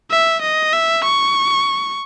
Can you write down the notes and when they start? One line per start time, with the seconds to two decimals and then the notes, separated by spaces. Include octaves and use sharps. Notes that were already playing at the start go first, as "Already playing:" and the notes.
0.11 E5
0.42 D#5
0.73 E5
1.04 C#6